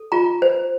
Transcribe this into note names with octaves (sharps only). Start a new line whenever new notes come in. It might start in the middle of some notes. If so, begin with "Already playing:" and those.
Already playing: A4
F4 A#5
C5